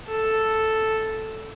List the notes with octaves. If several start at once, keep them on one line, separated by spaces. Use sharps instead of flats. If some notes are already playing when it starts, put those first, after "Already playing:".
A4